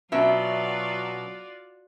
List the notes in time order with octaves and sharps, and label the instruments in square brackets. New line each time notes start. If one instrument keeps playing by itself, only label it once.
[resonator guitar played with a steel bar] B2 C#4 E5 [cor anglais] F#3 [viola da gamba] F4 F#4 D5